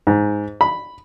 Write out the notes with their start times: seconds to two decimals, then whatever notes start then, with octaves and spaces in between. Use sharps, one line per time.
0.07 G#2
0.61 B5